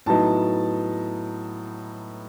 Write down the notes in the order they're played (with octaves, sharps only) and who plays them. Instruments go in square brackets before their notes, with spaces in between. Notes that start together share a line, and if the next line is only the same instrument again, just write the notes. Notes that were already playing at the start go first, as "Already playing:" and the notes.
[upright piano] A2 F#3 B3 D#4 A5